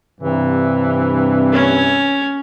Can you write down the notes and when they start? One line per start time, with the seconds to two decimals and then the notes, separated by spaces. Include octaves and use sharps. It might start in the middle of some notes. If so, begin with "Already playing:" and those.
0.21 G2 C3 E3
1.53 C#4